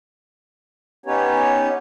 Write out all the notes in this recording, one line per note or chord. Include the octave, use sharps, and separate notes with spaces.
B3 C#4 D#4 G4 B4 C#5